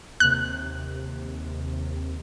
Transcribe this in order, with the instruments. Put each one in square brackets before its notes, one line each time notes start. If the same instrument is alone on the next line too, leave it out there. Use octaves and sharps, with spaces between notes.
[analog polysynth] D#2 C3 [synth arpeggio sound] F#6